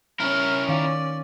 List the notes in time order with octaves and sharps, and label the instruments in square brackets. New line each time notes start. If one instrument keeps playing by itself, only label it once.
[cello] C#4 [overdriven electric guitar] E4 A#4 [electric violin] F6
[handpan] D#3 F5 [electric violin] D5